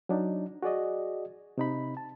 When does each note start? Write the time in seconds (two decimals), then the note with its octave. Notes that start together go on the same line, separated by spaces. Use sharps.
0.09 F#3 D4 D#4
0.63 F#4 G#4 D5 D#5
1.58 C3 D#4 B5
1.97 A5